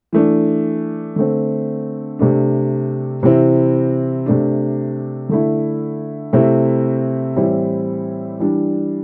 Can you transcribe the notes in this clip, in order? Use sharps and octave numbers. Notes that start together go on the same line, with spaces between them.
E3 A3 D4
D3 A3 C4
C3 A3 D4
C3 E3 C4 E4
C3 A3 D4
D3 A3 E4
C3 A3 C4 E4
A2 E3 G3 C4 E4
E3 G3 D4